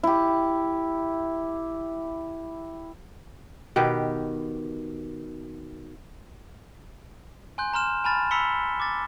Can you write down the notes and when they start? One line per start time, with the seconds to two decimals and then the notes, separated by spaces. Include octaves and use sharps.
0.03 E4 G4
3.76 B2 D#3 G4 B4
7.58 G#5 C6 F#6 G6
7.73 G#5 A#5 C6 F6 E7
8.04 G#5 A5 B5 F6 A6
8.31 A#5 B5 E6 B6 C#7 G7
8.80 D6 A6